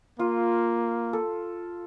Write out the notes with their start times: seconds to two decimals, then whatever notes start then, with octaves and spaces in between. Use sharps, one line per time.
0.19 A#3 F4
1.13 A4